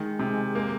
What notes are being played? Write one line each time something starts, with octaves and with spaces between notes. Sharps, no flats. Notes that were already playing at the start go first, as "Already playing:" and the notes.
Already playing: D#3 G#3
C3
A#3